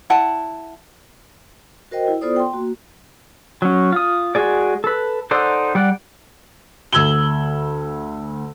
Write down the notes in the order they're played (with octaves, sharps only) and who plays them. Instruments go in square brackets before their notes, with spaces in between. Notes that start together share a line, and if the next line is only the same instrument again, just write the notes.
[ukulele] E4 F#5 A5
[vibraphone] F#4 A#4 C5 D#5 G5
E4
B3 F4 A4 C5 D5 D#6
G5 C6
A#3 F#4
[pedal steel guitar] F#3 C#4
F4 D#6
G#3 F#4 G#4 D5
A4 B4
D#4 A4 C5 D5 F#5
G3 D5 F#5
[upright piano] D2 E6 G#6 F#7 G7